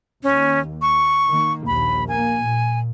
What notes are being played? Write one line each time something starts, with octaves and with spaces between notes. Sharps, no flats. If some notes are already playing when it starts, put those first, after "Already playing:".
D#2 C#4
C#6
D#3 A#3
A#1 D#2 B5
A#3 G#5
A#2